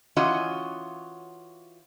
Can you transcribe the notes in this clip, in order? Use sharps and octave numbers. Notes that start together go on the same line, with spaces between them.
E3 C#4 F4 F#4 D#5